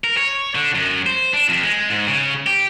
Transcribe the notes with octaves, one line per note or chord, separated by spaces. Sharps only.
A#4
C#5
D3
F#2
C5
D4
F2
G#3
G#2
C#3
G4